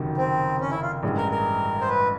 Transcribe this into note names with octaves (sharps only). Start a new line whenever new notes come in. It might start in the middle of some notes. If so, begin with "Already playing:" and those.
Already playing: F#1 F2 C3 D#3 F#3
C4
C#4
E4
F4
A1 G2 E3 G#3
A#4
A#4
C5
B4